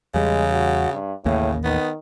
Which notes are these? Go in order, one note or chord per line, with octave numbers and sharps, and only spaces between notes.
E2 C#3 G3 G#3
F#4
G2
A1 D#2 A2 C#3 A#3
D#3 B3